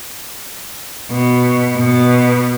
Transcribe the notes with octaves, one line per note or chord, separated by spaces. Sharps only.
B2
B2